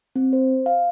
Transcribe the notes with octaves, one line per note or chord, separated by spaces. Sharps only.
C4
C5
F5